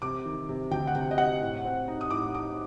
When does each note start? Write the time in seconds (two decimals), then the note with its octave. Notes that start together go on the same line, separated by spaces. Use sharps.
0.02 C3 D6
0.25 D#3
0.49 C3
0.71 D2 G5
0.87 F#5
0.95 C3 G5
1.11 D#5
1.17 C3 F#5
1.41 A2
1.65 C4
1.88 D#4
2.01 D#6
2.10 A2 D6
2.34 D#4 D6